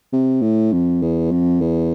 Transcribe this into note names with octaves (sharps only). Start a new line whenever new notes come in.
C3
A2
F2
E2
F2
E2